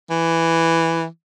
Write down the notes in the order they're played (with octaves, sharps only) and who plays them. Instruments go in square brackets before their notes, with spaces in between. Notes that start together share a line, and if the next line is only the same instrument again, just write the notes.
[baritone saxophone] E3